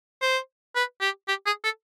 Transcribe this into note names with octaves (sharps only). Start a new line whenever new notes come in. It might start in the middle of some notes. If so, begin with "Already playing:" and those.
C5
B4
G4
G4
G#4
A4